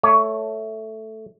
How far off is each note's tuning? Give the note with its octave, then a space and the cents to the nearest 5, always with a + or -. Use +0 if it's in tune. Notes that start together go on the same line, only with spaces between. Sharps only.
A3 +0 C#5 +15